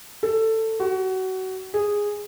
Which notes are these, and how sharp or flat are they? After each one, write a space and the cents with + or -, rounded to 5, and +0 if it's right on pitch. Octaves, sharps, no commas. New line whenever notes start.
A4 +15
F#4 +25
G#4 -10